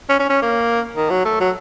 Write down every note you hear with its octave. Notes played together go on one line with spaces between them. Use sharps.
C#4
C#4
C#4
A#3
D#3
F#3
A3
F#3